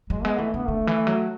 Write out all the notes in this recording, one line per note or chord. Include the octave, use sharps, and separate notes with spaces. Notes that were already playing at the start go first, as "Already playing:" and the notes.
F#3 G#3
G#3 B3
E3 A3
D3 B3
D3 A3
E3
F#3